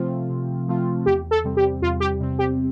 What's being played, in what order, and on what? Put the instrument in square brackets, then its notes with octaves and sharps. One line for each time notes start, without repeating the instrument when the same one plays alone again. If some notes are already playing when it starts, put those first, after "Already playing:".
Already playing: [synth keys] C3 F3 A3 C4 F4
C3
F3 A3 C4 F4
[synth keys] E2 [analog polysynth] G4
[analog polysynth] A4
[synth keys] C3 G3 C4
[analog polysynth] G4
[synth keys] E2 [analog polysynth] F4
[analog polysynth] G4
[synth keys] C3 G3 C4
[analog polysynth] G4